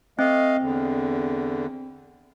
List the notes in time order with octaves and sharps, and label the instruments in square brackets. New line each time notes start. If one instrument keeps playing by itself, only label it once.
[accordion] A3 D#5 F5 [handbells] C4
[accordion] E2 D3